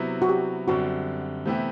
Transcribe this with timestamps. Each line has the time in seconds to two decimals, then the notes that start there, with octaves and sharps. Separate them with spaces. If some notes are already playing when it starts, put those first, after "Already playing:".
Already playing: C3 F#3 B3 E4
0.22 F#4
0.29 G4
0.68 F#2 D3 G3 C4 F#4
1.45 C3 E3 A3 B3 E4 G4